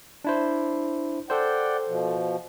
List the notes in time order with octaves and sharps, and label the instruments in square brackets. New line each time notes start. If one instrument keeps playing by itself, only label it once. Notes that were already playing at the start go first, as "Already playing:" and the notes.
[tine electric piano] D4 E4 C5
[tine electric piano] A4 C5 [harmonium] D5 F#5 G5
[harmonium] B2 F3